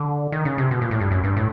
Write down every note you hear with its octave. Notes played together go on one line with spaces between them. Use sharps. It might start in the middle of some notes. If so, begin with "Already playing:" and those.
Already playing: D3
D#3
C#3
C3
B2
A#2
A2
G2
F#2
G2
A2